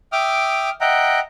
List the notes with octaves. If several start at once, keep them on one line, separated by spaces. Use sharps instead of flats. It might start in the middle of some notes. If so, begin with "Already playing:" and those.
E5 G5 D6 D#6 F6
D#5 E5 F#5 G5 A#5